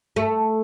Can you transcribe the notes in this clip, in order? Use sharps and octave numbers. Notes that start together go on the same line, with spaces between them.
A3